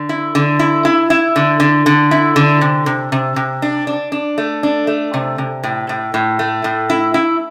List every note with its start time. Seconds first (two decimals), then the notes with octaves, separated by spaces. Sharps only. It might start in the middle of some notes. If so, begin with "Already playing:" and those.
Already playing: D3
0.09 E4
0.35 D3
0.59 E4
0.85 E4
1.10 E4
1.36 D3
1.60 D3
1.86 D3
2.11 E4
2.36 D3
2.61 C3
2.86 C3
3.12 C3
3.36 C3
3.62 D4
3.87 D4
4.12 D4
4.38 A3
4.63 D4
4.87 A3
5.14 C3
5.38 C3
5.63 A2
5.89 A2
6.14 A2
6.39 A3
6.64 A2
6.90 E4
7.14 E4